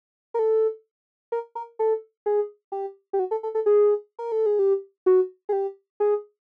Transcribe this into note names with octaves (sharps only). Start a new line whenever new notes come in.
A#4
A4
A#4
A#4
A4
G#4
G4
G4
F#4
A4
A4
A4
G#4
A#4
A4
G#4
G4
F#4
G#4
G4
G#4